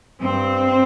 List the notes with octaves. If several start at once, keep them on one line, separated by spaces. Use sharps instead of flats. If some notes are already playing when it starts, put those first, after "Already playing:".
G2 C4